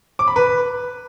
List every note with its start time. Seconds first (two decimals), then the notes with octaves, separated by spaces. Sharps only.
0.19 D6
0.28 B5
0.36 B4